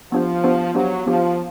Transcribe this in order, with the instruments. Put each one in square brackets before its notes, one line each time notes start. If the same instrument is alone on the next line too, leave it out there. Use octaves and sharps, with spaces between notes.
[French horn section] F3 [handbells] B3 D4 G4 C5
[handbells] B3 D4 G4 C5
[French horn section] F#3 [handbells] B3 D4 G4 C5
[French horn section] F3 [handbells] B3 D4 G4 C5